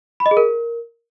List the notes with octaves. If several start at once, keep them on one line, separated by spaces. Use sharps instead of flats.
B5
D#5
G#4
A#4